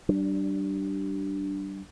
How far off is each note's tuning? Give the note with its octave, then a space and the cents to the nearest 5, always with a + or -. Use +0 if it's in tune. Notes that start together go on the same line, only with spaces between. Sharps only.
G3 -30 D4 +0